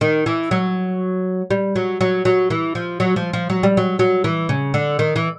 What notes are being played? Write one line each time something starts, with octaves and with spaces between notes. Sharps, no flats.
D#3
E3
F#3
G3
F#3
F#3
F#3
E3
F3
F#3
F3
F3
F#3
G3
F#3
F#3
E3
C#3
D3
D#3
E3